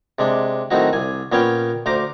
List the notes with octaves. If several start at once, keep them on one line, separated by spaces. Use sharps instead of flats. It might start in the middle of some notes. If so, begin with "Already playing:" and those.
C3 G#3 D4
A2 D#3 F#3 C4 D#4 F#4
C2 G#5
A#2 B3 C#4 C#5 F5 G5
D2 C5 A#5 D6